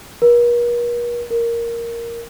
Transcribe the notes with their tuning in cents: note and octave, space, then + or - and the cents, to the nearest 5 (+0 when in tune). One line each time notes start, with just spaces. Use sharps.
A#4 +45
A#4 +0